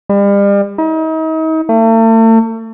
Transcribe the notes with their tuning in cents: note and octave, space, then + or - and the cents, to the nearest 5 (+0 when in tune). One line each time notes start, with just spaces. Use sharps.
G3 +40
D#4 +40
A3 +40